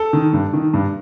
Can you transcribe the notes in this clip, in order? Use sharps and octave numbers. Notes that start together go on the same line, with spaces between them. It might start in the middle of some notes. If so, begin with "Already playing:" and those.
Already playing: A4
D#3
G2
D#3
G2